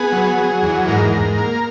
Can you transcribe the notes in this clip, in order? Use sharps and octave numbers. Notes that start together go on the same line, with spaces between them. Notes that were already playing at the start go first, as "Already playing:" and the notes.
Already playing: B3 G#4
F#3
F#3
E2
G#2 A#4
G#2
A#3